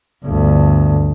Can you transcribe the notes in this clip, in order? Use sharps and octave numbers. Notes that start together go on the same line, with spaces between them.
G1 D2